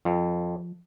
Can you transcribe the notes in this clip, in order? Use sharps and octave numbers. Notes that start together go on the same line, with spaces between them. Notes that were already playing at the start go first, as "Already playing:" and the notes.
F2 F3